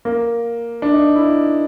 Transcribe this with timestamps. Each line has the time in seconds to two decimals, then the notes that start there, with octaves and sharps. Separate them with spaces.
0.05 A#3
0.82 D4
0.93 D#4
1.16 E4